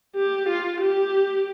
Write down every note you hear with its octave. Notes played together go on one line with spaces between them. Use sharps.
G4
F4
G4